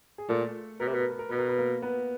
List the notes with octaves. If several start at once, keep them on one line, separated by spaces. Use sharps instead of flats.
G#4
A#2 A3 A4
B2 A#4
C3
B2 B4
A#4
B4
A#4
B2 B4
A#4
B4
A#3 A#4
B3 B4